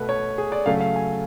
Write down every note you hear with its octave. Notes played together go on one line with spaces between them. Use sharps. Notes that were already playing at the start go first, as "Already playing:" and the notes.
Already playing: B2 A3 B4
C#5
G#4
D5
C#3 F#3 A3 F5
F5
G#5